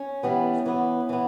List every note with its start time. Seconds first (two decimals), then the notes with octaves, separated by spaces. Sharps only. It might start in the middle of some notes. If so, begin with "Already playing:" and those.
Already playing: C#4
0.23 E3 G3 B3
0.66 E3 B3
1.09 E3 B3